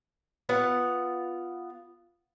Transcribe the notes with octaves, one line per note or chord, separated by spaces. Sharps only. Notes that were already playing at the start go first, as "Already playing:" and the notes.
B3 F4 F#5